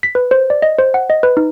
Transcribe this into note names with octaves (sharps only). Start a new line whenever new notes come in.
B6
B4
C5
D5
D#5
C5
F#5
D#5
B4
D#4